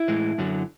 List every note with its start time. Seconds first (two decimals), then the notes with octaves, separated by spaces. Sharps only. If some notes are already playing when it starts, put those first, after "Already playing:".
Already playing: E4
0.08 A2 E3 G#3
0.38 F#2 D3 F#3